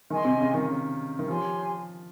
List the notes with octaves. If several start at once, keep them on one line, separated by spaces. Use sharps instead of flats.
D#3 G#4 D#5 G#5 C6
C3
C#3
D#3
C#3
D#3
F3 G4 C#5 G#5 C6